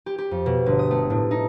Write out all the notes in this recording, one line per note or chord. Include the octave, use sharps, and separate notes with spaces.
G4
G4
F2
B2
G1
D#6
A3
A2
D#4